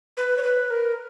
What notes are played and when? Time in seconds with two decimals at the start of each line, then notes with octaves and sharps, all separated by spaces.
0.17 B4
0.37 C#5
0.43 B4
0.70 A#4